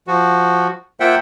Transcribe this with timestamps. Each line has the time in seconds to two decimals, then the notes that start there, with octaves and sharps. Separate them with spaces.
0.07 F3 F#4
1.00 A#3 F4 C5 E5 F#5 G5